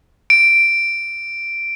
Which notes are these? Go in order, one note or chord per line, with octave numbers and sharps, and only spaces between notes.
D7